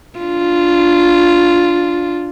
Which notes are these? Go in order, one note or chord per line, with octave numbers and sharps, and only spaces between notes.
D4 F4